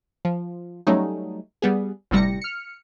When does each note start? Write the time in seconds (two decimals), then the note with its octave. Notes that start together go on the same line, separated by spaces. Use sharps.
0.25 F3
0.87 F#3 G3 A3 C#4 D#4
1.62 G3 B3 G#4
2.11 G1 A2 C3 G3 A#6 C#7
2.41 F6 C#7